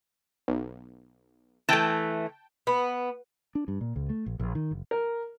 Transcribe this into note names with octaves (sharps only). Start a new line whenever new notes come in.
B1
E3 A3 G5 A5
B3
D4
G2
A#2
C#2
A3
A#1
A#1
D#3
F#1
A#4